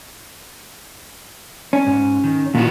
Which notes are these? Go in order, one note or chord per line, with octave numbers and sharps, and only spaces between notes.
C#4
G#2
D#3
A#2 D#3 E3 F#4